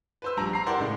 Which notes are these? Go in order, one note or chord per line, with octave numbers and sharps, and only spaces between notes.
B4 C5 E6
A#1 G3 D4 A#5
A#5 C7
E4 G4 A#4 C5 D5 F#5
A2 C#3 G#3